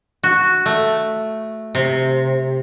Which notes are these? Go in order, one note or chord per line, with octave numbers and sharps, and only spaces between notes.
F#4
A3
C3